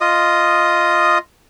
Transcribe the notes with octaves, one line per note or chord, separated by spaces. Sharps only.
F4 D#5 D#6